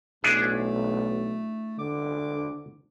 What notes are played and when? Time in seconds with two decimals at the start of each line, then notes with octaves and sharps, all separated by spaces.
0.24 B1 A3 D4 E4 G#4
1.79 D3 D6